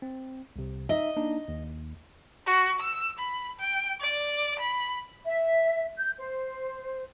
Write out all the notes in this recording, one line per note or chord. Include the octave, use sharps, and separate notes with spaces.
C4
C2 C3
D#4 D#5 E5
A#3 D4 D#4
D#2
F#4
E6
B5
G5
D5
B5
E5
G6
C5